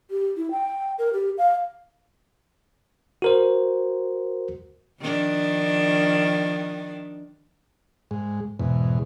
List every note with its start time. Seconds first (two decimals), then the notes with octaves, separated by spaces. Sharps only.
0.11 G4
0.37 E4
0.51 G5
0.98 A#4
1.13 G4
1.38 F5
3.22 F#4 A#4 C5
5.01 D#3 F3 D4
8.11 G#2 G#3
8.60 E2 G#2 B2